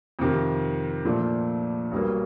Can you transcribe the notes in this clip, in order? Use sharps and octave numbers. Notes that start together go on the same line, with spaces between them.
F2 C3 D#3
A#2 F3 A3 D4
B1 B2 G3 A#3